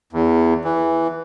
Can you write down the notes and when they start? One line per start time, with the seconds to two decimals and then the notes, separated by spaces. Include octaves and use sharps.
0.13 E2
0.64 E3